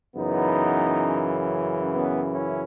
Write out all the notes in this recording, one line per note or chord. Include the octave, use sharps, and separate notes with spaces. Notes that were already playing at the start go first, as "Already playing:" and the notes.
F#2 C#3 E3 B3 D#4
B3
C#4 E4